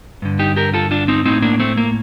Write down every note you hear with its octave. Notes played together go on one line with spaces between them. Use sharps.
G2 D3
D#4 G4
G4 A#4
F4 A4
D4 F4
C4 D#4
A2 C4 D#4
A#3 D4
A3 C4
A#3